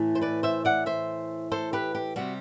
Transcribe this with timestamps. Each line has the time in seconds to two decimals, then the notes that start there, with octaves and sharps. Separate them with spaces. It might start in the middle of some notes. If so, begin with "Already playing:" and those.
Already playing: A2 E3 A3 E4
0.15 C5
0.21 B4 D5
0.43 C5 E5
0.65 D5 F#5
0.86 C5 E5
1.52 A4 C5
1.73 G4 B4
1.95 G4
2.16 C3 G3 F#4